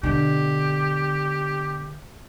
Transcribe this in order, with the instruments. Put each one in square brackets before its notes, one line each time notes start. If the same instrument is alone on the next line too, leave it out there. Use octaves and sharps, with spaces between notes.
[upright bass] B2 D3 [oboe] G4